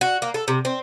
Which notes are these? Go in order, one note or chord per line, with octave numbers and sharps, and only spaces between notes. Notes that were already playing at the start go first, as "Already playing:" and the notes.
F#4
A#3
A4
C3
C4